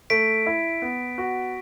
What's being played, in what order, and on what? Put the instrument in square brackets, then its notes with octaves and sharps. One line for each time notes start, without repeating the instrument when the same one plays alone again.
[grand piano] A3 [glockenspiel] B6 D7
[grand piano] E4
B3
F#4